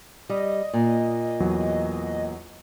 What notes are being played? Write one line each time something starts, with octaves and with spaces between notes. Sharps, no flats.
G3 D#5
A#2
E2 F#3